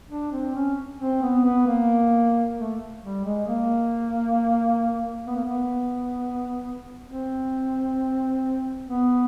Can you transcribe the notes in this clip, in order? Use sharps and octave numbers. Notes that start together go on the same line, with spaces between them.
D4
C4
C#4
C4
B3
B3
A#3
A3
G3
G#3
A#3
B3
A#3
B3
C4
B3